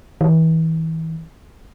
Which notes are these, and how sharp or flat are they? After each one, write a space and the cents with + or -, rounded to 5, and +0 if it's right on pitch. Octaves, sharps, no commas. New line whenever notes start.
E3 -35